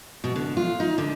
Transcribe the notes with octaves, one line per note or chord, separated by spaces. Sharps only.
B2
D3
F4
D#4
D3